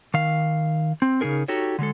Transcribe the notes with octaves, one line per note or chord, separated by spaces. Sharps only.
D#3 F5
C4
C#3 F#3 D#4 G#4 A#4
D#4 F#4 G4 A4 C#5
D3 F#3 G#3 A4